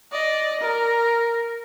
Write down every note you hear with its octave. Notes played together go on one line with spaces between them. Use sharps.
D5 D#5
A#4